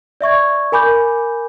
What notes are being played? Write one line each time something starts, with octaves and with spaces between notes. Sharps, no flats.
D5 E5 C#6 G#6
A#4 G#5 B5 D6 G6